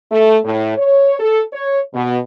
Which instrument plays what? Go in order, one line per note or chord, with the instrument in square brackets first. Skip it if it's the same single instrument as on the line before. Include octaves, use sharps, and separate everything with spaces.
[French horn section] A3
A2
C#5
A4
C#5
B2